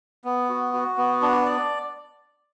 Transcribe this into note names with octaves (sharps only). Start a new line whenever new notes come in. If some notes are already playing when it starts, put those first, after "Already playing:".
B3
F#4
F#4
B3
D4
D5